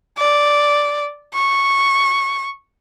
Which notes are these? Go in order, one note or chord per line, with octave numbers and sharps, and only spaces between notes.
D5
C#6